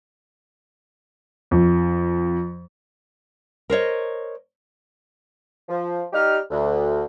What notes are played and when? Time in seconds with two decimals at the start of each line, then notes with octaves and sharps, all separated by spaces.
1.51 F2
3.70 A#4 C5 C#5 D#5
5.69 F3
6.13 G3 D#4 G4 F6
6.50 D2